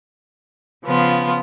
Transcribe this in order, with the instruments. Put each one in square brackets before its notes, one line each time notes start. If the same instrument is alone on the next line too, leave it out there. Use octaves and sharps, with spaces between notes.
[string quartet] C#3 F3 B3 F4